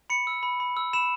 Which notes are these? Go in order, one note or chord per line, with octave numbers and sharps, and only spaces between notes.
B5 C#7
E6
B5
B5
E6
B5 E7